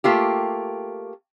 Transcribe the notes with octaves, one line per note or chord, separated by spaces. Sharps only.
A3 A#3 F4 G4